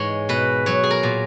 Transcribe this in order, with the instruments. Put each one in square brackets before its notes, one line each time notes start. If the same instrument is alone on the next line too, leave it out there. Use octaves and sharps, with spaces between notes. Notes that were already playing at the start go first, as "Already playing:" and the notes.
Already playing: [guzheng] G#2 E3 G#3 C#5
B2 B4
F#3 C#5
G#4
A#4
A#2